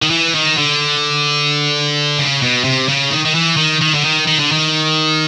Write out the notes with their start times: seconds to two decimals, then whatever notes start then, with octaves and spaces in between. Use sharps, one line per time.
0.02 D#3
0.10 E3
0.35 D#3
0.57 D3
2.19 C#3
2.42 B2
2.64 C3
2.89 C#3
3.11 D#3
3.25 D#3
3.35 E3
3.57 D#3
3.81 D#3
3.94 D3
4.04 D#3
4.27 D#3
4.39 D3
4.52 D#3